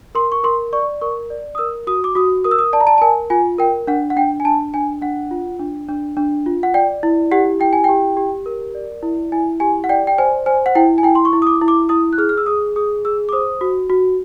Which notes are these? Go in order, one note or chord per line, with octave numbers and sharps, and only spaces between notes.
A#4 C6
C#6
A#4 C6
D5 C#6
A#4 C#6
D5
D#6
A#4 E6
F#4 D#6
D6
F#4 D#6
A#4 D#6
E6
D#6
D5 A5
A#5
A5
A5
A#4 G#5
F4 G#5
A#4 G5
D4 F#5
F#5
D4 G5
G#5
D4 A5
D4 G#5
D4 F#5
F4
D4
D4
D4
F4
F#5
D5 G5
E4
G4 F#5
E4 G5
G#5
G4 G5
G4
A#4
D5
E4
E4 G#5
G4 G#5
F#5
D5 G5
G5
C5 G#5
C5 G#5
F#5
E4 G5
G#5
E4 G5
C6
C#6
E4
D#6
D6
E4
D6
E4 D#6
F#6
G#4 F6
F6
E6
G#4 D#6
G#4 D#6
G#4 E6
D6
C5 D#6
F#4
F#4